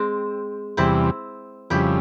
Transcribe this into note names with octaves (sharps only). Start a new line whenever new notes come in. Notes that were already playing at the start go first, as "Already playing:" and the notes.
Already playing: G#3 C4
E2 C3 G3 C4 E4
F2 C#3 G3 E4 G4